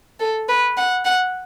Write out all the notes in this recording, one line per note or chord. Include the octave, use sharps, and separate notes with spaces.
A4
B4
F#5
F#5